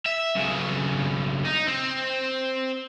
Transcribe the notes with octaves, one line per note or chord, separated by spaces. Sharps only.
E5
B1 C#3
D#4
C4